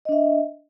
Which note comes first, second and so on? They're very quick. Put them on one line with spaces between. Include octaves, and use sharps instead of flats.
D#5 D4 E5